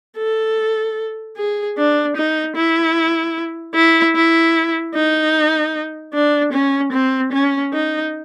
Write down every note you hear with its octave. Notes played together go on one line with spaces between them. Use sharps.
A4
G#4
D4
D#4
E4
E4
E4
D#4
D4
C#4
C4
C#4
D#4